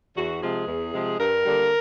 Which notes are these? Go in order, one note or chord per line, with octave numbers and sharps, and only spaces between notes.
E2 F#4
C3 F3 G#3 G#4
E2
C3 F3 G#3
G2 A#4
D3 G3 A#3